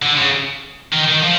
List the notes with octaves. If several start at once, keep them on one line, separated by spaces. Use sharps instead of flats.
D3
C#3
D#3
D#3
F3